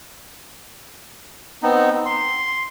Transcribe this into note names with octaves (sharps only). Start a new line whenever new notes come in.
B3 C4 D#4
C6